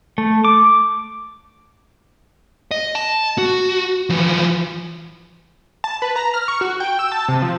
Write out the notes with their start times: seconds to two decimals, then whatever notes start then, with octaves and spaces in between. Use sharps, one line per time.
0.18 A3
0.45 D6
2.71 D#5
2.95 A5
3.38 F#4
4.10 E3 F3
5.84 A5
6.02 B4
6.16 A#5
6.34 F6
6.48 C#6
6.61 F#4
6.80 G5
6.99 E6
7.12 A5
7.28 C3
7.42 F3